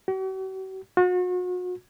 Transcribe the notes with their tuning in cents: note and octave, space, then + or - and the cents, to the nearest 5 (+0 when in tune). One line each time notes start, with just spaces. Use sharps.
F#4 +45
F#4 -40